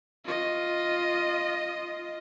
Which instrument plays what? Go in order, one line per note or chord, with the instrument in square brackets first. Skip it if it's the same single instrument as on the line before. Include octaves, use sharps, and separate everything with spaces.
[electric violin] F4 D#5